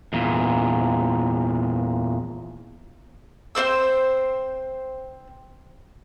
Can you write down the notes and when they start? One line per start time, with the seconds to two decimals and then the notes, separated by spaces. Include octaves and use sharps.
0.13 E2 A#2
3.55 C4 F#4 C5 E6